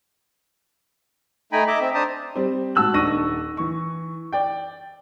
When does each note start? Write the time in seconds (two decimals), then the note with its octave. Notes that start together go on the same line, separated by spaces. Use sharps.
1.52 A3 D#4 G5 G#5 A#5 B5
1.68 D#5 E5 A#5 D6
1.81 C4 E5
1.94 D4 C5 A5 A#5 D#6
2.35 G3 C4
2.75 G#2 F#4 A5 E6 F#6 F#7
2.94 D#1 D4 D#4 C#6 A#6 D#7
3.57 E3 C#6
4.33 D5 G5